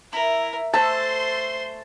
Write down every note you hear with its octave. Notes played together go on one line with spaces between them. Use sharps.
E4 A#4
A3 C5 A5 C6 E6